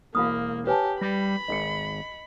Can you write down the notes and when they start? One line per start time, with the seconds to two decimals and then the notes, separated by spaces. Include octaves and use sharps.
0.15 E1 A#3 F5 B5 D#6 F6
0.67 G4 B4 C#5 G#5 A5
1.01 G3 B5 A#6
1.48 G#1 D#5 C#7